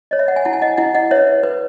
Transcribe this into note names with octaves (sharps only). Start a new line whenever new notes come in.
C#5 D#5
E5
F#5
G#5
E4 F#5 A5
G#5
D#5 F#5
E4 D#5 F#5
D#5 F#5
B4 C#5 E5
B4